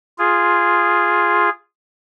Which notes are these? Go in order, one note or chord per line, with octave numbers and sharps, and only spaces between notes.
F4 G#4